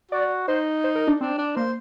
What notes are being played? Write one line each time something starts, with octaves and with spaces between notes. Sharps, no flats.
F#4 D5
D#4 C5
C5
A#4
D4
C4 D4
D4
A#3 C5